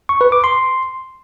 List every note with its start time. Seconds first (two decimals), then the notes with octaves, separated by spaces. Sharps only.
0.09 C#6
0.21 B4
0.32 D6
0.44 C6